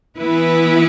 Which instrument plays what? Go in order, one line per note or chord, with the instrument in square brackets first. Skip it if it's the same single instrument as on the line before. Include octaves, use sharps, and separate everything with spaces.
[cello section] E3 B3 E4 B4